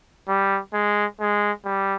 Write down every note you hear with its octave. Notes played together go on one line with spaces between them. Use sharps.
G3
G#3
G#3
G3